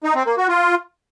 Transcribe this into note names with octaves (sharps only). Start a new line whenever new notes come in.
D#4
C4
A#3
F#4
F4